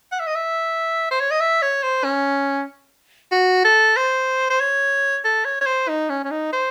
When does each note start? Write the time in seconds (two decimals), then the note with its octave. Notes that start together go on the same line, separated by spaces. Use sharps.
0.12 F#5
0.20 E5
0.27 D#5
0.35 E5
1.11 C5
1.20 C#5
1.31 D#5
1.40 E5
1.62 C#5
1.83 C5
2.04 C#4
3.32 F#4
3.65 A4
3.96 C5
4.50 C5
4.60 C#5
5.25 A4
5.45 C#5
5.61 C#5
5.66 C5
5.89 D#4
6.10 C#4
6.24 C#4
6.31 D#4
6.53 C5